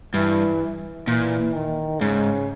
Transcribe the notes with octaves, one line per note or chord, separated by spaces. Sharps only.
G2 E3
A#2 E3
D#3
G#2 C#3